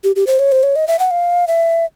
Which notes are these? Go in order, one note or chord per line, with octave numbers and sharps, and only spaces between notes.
G4
G4
C5
C#5
C5
C#5
D#5
E5
F#5
F5
E5